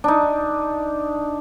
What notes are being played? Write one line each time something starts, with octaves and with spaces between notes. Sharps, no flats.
D4 D#4